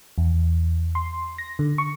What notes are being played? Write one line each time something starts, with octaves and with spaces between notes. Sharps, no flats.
E2
C6
A#6
D3
C#6